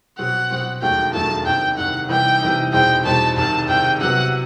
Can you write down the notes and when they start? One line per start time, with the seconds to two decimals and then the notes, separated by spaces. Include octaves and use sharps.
0.18 B2 F#3 C4 F#5
0.50 B2 F#3 C4
0.82 E1 D#2 D#3 F#3 A3 G5
1.13 E1 D#2 D#3 F#3 A3 A5
1.45 C2 C3 D#3 G5
1.77 C2 C3 D#3 F#5
2.09 C3 E3 G3 D#4 G5
2.41 C3 E3 G3 D#4
2.72 E2 B2 G3 C4 D#4 G5
3.05 E2 B2 G3 C4 D#4 A5
3.37 C2 C3 D#3 A5
3.68 C2 C3 D#3 G5
4.00 C3 F#3 B3 F#5